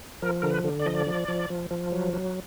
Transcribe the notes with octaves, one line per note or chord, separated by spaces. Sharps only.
F3 A#4
D3 A#4
B4
D3
D5
F3 D#5
D5
F3
F3
F3
F3
F#3
F#3